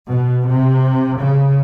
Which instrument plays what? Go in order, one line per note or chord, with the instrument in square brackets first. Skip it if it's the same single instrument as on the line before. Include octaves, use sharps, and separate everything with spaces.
[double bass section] B2
C3
C#3